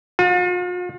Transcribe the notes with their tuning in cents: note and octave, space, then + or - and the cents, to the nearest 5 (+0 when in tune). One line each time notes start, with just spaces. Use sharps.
F4 +45